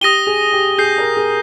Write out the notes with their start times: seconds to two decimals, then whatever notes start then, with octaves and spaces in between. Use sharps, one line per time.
0.01 G4 D#6 A#6 D#7 G7
0.27 G#4
0.52 G4
0.78 G#4 G6 C7 G7
0.98 A#4
1.17 G#4